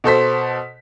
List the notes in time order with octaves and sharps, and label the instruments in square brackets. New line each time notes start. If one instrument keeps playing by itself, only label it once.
[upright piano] B2 A4 C5 B6